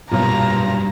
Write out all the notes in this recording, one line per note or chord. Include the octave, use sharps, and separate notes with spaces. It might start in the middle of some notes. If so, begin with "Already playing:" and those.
B1 F#2 A#2 G3 A#5